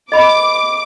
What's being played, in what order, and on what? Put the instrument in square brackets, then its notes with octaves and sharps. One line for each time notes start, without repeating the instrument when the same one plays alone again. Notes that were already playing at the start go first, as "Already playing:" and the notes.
[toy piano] D#5 B5 [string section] D6